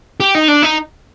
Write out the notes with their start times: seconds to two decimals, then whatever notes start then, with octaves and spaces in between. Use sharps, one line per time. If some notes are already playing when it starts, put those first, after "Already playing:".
0.20 G4
0.35 D#4
0.48 D4
0.63 D#4